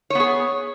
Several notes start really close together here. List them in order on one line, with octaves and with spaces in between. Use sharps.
C#5 B3 G#4